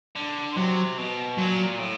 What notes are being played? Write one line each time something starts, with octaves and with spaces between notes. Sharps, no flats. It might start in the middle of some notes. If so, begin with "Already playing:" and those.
D3
C3 F#3
B2
A#2 F#3
A2